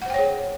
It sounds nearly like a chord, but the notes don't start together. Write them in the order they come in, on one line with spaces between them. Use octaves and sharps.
F#5 C5 G5 C#5 G#4